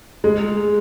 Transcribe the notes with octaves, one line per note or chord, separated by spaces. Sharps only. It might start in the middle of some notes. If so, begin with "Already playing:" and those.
G#3